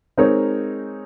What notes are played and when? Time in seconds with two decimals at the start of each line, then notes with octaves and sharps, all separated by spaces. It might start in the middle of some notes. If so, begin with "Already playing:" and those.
0.18 G#3 C4 D#4 A#4 C#5